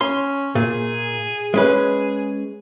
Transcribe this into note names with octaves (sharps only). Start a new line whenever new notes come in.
C#4 C6
A#2 G#4
G#3 C#4 G#4 B4